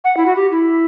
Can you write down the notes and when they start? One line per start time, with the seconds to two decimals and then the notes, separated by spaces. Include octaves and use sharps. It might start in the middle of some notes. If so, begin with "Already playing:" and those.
0.04 F#5
0.17 E4
0.26 F#4
0.36 G4
0.52 E4